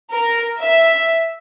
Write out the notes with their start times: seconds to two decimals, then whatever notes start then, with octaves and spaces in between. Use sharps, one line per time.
0.12 A#4
0.61 E5